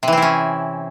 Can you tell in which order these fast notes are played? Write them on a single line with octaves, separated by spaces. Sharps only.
C3 E3 C4 E4 C#4